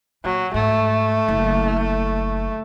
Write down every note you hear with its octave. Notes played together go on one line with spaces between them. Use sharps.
A#2 F#3
G#2 A3
F#1